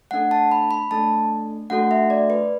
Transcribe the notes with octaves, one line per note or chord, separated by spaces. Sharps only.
A3 D4 A4 F#5
A5
B5
B5
A3 D4 A4 A5
A3 D4 F#4 A4 F#5
E5
D5
B4